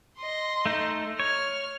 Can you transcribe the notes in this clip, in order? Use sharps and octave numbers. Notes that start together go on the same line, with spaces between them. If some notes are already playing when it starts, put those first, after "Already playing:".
D#5 C6
A3 D#4
C#5 F6